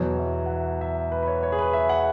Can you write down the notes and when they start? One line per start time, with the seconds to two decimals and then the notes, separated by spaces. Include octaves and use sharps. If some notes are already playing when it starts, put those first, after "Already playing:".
Already playing: E2 B2 F#3 C#5
0.19 E5
0.46 F#5
0.50 E5
0.81 E5
1.12 B4
1.23 B4
1.27 C#5
1.43 C#5
1.52 G#4
1.58 B4
1.73 E5
1.89 F#5